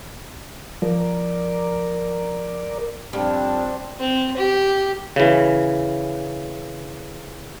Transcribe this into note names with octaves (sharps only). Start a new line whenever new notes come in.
F3 A#4 D5
F2 G3 C4 D4
C4
G4
C#3 E3